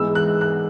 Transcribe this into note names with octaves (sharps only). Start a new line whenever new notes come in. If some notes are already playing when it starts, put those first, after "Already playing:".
Already playing: G#2 E3 G#3 B3 E6
F#6
F#6